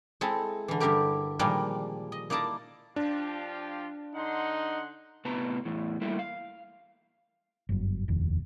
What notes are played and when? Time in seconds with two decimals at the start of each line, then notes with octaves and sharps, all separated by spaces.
0.21 G#3 C4 E4 A4
0.68 D3 E3
0.80 G2 D3 G3 E4 G4 A#4
1.39 A#2 D#3 F3 G3 G#3 A#3
2.12 D#5
2.30 A#3 D#4 E4 D5 A5 A#5
2.96 F3 D4 F4 G4
4.16 D3 D#4 F#5 C6
5.25 A2 C3 B3 B4 A5 A#5
5.65 E2 A2
6.01 G3 A3 A#3 E4
6.19 F5
7.69 G1 F#2
8.08 F1 A#1 D#2